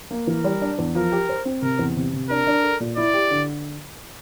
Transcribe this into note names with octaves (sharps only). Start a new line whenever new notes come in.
A#3
E3 A#4
G3
D4
E2
F3 A#4
G4
C5
C4
C3 A#4
E2
C3
C3
D4 A#4
D4
A4
A#2
E4 D5
G4
D3